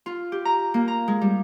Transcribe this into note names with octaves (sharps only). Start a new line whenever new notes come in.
F4
G4
A#5
A#3
A#5
G#3
G3